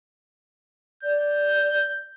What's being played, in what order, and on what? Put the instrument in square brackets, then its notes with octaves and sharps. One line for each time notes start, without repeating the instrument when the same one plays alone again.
[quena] D5 [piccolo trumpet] G6